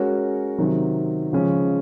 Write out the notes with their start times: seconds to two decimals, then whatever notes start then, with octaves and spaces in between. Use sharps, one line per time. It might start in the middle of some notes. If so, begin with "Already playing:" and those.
Already playing: G#3 C#4 F#4 A#4 C#5
0.58 C3 D#3 F#3
1.33 C#3 F3 G#3 C#4